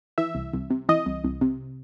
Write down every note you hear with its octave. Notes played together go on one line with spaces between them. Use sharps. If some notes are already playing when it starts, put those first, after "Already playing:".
E3 E5
C2
C2
C3
E3 D#5
C2
C2
C3